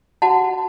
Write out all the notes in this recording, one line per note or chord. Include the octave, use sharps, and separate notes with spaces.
F#4 F#5 A5